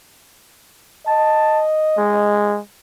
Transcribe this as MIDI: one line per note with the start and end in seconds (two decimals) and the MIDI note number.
1.07 2.36 75
1.07 1.64 81
1.97 2.60 56